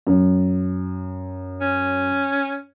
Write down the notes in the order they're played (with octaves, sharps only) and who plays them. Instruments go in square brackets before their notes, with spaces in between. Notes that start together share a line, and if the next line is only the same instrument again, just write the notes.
[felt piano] F#2
[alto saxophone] C#4